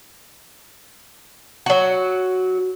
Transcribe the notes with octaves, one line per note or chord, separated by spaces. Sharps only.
F#3 F#4